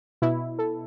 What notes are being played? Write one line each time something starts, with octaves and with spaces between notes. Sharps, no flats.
B2 E4
A4